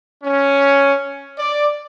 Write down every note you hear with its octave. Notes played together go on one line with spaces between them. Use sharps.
C#4
D5